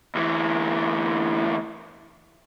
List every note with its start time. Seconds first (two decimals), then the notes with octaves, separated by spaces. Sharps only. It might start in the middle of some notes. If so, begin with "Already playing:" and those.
0.15 D2 E3